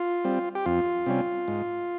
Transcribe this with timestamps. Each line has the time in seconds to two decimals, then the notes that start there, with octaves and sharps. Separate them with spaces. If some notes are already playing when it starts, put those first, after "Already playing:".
Already playing: F4
0.25 G3 C4
0.55 G4
0.66 F2 F4
1.06 C3 G3 C#4
1.48 G#2